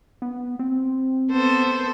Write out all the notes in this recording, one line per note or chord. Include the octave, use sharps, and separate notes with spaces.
B3
C4
B3 A4 C5